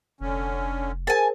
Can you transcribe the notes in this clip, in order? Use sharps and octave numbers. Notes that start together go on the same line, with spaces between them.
F1 D3 C#4
G#4 A#4 C5 G#5 A5